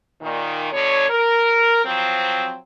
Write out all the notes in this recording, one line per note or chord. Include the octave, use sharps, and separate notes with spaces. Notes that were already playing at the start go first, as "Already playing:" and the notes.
A#2 D#3
B2 D3 C#5
A#4
F3 F#3 C4